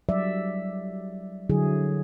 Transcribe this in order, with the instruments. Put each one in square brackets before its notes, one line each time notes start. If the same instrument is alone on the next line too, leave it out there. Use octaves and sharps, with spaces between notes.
[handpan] F#3 G3 D5 E5
D3 F#3 E4 G#4